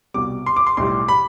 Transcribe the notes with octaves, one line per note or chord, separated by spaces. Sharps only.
C2 B2 G3 D6
C6
D6
C6
B1 A2 G3 C6
B5